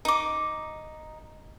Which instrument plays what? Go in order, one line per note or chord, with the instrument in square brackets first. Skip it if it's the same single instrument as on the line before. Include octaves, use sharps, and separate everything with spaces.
[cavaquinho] D#4 D6